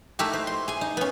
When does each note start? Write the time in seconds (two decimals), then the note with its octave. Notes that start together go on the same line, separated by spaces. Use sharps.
0.19 A3 D#4 E4 F#4 G4
0.33 C5
0.47 C6
0.68 G#4 G#5
0.81 D#4
0.97 B3 C#4